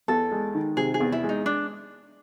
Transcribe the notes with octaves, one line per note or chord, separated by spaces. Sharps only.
E2 A4
G#3
D#3
C3 G#4
G#4
E2
E4
G#3
D#4
D4